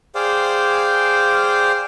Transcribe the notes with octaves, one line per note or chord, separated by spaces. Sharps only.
G#4 C5 D5 F5 G5